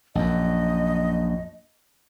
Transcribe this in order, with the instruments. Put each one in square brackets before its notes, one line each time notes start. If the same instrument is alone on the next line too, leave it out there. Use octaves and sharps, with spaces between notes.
[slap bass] A#1 F#2 [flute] D#5